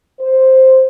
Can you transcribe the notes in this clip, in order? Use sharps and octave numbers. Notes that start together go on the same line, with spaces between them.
C5